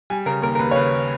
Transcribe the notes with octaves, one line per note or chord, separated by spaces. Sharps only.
G3 G#5
C#3 A#4
D#2 A#4
A#4
D#2 B4
C#5
C#3 B4